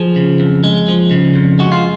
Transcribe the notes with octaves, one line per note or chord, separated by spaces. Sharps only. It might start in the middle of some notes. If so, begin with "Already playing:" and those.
Already playing: F3 G#4
C#3
F2
G#3
F3
C#3
F2
G#3 F#4
F4